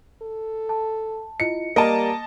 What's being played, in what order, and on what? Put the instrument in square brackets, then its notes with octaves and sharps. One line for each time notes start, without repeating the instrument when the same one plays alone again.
[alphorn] A4
[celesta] A5
[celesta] E4 F4 D#5 [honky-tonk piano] C#7
[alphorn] G3 [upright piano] A#3 [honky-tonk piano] D#5 A5 [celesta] A#5 D7 D#7